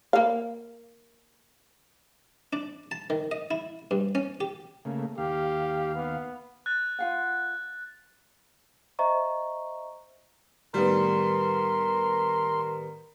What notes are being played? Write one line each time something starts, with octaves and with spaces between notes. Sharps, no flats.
A#3 F5
D4
A5
D#3
D#5
E4
G2
C#4
G4
C#3 A3 A#3
D#2 G4 F5
B3
F#6 A6
F4 F5 F#5
C5 D#5 E5 A#5 C#6
A2 D#3 G3 B3 A#4 C6